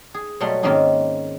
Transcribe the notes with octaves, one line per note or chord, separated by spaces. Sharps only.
G#4
B2 F#3 G3 A3 F#5 C6
G#2 D#3 A#3 C4 C#4 D#4